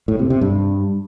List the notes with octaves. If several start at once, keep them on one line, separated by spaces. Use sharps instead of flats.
A2
C3
C3
G2